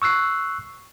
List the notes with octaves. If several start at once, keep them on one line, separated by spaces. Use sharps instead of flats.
C#6 E6 F#6 C7